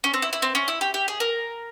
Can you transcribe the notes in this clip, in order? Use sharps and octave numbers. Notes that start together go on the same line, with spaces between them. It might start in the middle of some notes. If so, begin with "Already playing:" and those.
C#4
C4
E4
E4
C4
C#4
E4
G4
G4
G#4
A#4